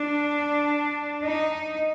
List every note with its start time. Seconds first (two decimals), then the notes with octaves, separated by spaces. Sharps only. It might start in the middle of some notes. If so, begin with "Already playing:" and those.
Already playing: D4
1.24 D#4